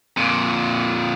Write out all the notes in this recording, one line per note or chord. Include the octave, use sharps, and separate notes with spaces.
F2 A#2